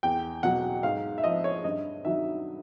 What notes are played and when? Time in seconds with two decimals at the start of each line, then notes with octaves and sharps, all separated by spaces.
0.03 E2 G5
0.43 B2 F#3 F#5
0.83 G#2 F5
1.18 E5
1.24 F3 D#5
1.44 C#5
1.64 G2 D#5
2.05 D#3 F#3 E5